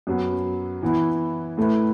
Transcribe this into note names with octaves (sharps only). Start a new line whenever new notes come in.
F#2 F#3 B3
E3 B3 E4
A2 A3 E4 B4